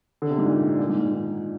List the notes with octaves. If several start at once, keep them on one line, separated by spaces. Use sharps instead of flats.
D3
C3
G#2
A#2
A#2
G#2
A#2
D#3